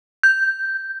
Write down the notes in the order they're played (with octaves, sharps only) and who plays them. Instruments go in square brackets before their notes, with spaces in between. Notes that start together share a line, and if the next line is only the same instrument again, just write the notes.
[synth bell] G6